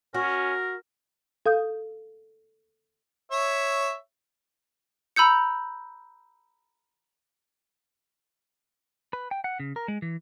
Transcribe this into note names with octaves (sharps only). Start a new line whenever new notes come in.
C#4 F#4 A#4
A4 F5 D#6 G6
C#5 E5
A#5 B5 E6 G6 C#7
B4
G5
F#5
C#3
A#4
G#3
E3